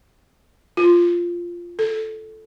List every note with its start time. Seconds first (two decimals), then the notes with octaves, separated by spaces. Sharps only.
0.77 F4
1.79 A4